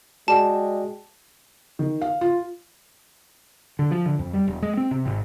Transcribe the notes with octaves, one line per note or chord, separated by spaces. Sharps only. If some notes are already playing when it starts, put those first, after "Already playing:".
G#3 F#4 D5 G5 A5
D#3
F5
F4
D3
F3
D3
F2
G3
E1
G#3
C4
C3
G#1